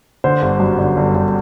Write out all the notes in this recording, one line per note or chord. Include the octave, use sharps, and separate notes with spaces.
D3 C5
G1
F#2
D3
G1
G1